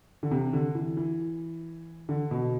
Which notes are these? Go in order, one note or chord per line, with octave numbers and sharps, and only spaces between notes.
D3
C3
D3
E3
E3
D3
B2